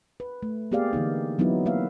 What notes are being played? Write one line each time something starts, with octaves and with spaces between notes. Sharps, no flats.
B4
A3
A#3 B3 G4 G#4 D5 F5
D3 E3 A#3 D#4
E3 F#3 B3 C4 D#4 E4
A#3 B4 E5 F5